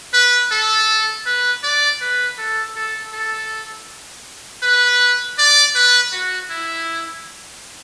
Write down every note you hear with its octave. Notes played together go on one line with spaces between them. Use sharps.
B4
A4
B4
D5
B4
A4
A4
A4
B4
D5
B4
F#4
E4